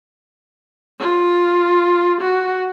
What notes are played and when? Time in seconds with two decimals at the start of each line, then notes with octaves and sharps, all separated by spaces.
1.00 F4
2.21 F#4